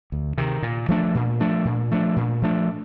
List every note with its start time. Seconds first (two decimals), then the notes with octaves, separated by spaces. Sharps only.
0.12 D2
0.38 C3 D#3
0.63 A#2
0.88 F3 A3 D4
1.15 A#2
1.40 F3 A3 D4
1.65 A#2
1.91 F3 A3 D4
2.16 A#2
2.42 F3 A3 D4